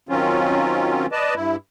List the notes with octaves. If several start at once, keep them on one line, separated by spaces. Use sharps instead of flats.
D#3 F#3 C4 C#4 F4
B4 D5 D#5 A5
G2 E4